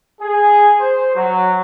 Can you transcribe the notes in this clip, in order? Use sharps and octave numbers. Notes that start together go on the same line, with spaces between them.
G#4
C5
F#3